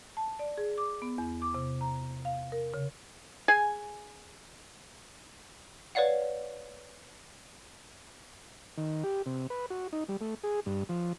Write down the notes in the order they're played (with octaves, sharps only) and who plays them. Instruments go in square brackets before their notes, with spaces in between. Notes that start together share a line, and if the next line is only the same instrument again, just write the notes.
[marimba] A5
D5
G#4
D6
B3
E2
D6
C3
A#5
F5
A#4
C#3
[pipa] G#4 G#5
[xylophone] B4 C#5 D5 F5 F#5
[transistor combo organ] D#3
G4
C3
B4
F#4
D#4
G3
A3
G#4
G2
F3